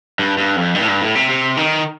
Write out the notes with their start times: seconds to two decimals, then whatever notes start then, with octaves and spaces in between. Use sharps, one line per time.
0.19 G2
0.38 G2
0.56 F2
0.75 G2
0.81 A2
0.88 G2
1.02 A2
1.15 C3
1.29 C3
1.57 D#3